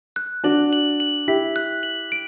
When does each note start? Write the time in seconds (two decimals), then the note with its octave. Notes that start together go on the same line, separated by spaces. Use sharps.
0.16 F#6
0.44 D4 F#4 F#7
0.73 F#7
1.00 F#7
1.28 E4 G4 B6
1.56 F#6
1.83 F#7
2.12 D7